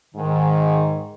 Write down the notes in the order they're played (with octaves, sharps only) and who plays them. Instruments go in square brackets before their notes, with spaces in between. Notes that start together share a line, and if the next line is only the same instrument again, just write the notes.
[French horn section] G#2 [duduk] D#3